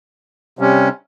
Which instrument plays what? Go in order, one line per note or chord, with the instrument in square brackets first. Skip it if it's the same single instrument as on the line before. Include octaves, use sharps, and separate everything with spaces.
[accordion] C3 G3 C#4